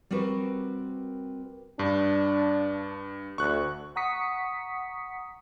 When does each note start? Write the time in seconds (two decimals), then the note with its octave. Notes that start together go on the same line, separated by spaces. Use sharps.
0.11 G3 C4 F#4 A#4 B4
1.79 G2 D4
3.38 D2 C#6 F#6
3.96 F#5 A#5 C#6 D#6 B6 C#7